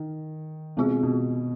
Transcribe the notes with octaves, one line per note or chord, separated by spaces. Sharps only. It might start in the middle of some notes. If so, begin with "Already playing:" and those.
Already playing: D#3
B2 G#3 C4 F4 G#4
B2